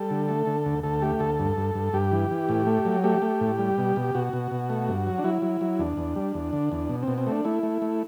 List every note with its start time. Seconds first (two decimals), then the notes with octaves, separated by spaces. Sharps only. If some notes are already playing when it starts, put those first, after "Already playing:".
Already playing: G3 A4
0.10 D3
0.29 A3
0.47 D3
0.66 D2
0.83 D2 A4
1.02 A3 G4
1.20 D2 A4
1.39 G2
1.57 G2
1.75 G2
1.93 G2 G4
2.12 E3
2.31 E3
2.49 A2
2.67 A3
2.85 F#3
3.04 A3 G4
3.22 A3
3.41 A2
3.58 G3
3.78 B2
3.96 B2
4.15 B2 F#4
4.33 B2
4.51 B2
4.70 A3
4.88 G2
5.07 F#3
5.18 D4
5.24 F#3 E4
5.42 F#3
5.61 F#3
5.79 E2 D4
5.97 E2
6.16 G3
6.34 E2
6.53 D3
6.72 E2
6.89 B2
7.03 B2 C4
7.18 C4
7.27 A3 D4
7.45 A3 E4
7.63 A3
7.82 A3